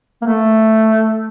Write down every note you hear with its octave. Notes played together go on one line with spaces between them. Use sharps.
A#3
A3